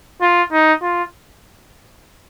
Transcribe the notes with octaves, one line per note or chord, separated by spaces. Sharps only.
F4
D#4
F4